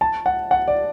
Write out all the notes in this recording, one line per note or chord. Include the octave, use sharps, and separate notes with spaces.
A5
F#5
F#5
D5